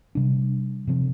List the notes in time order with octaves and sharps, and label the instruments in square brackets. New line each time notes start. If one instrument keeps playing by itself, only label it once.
[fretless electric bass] C3 G3 D4
C3 F3 C4